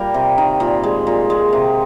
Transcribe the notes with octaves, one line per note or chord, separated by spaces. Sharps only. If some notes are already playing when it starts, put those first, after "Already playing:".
Already playing: A#2 G3 A#3 A#4
C3
D#3
A#2
G#3
A#2
G#3
C3